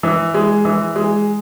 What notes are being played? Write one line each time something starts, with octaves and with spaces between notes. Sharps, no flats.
E3
G#3
E3
G#3